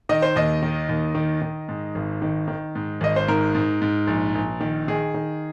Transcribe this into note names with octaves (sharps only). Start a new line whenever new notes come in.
D#3 D#5
C5
D#2 D#5
D#3
D#2
D#3
D#3
G#2
G#1
D#3
D#3
G#2
G#1 D#5
C5
G#2 A#4
G#2
G#2
A#1
A#1
D#3
D#3 G#4
D#3